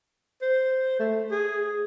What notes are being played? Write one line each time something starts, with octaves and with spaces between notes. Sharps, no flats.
C5
A3
G#4